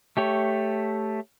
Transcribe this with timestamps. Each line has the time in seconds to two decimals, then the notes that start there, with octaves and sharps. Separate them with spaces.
0.17 A3 G4 C#5